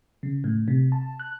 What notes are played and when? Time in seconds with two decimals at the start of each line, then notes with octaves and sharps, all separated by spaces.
0.23 C#3
0.44 A2
0.68 C3
0.92 A5
1.20 F#6